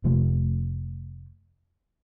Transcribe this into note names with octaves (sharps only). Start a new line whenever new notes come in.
F1 C3 F3 A3